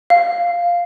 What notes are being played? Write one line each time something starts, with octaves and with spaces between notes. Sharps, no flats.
F5